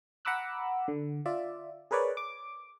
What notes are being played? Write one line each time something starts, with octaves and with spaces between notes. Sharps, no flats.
F#5 A#5 B5 D6 E6 F#6
D3
F4 D5 E5
G#4 A#4 B4 C#5 D5
D6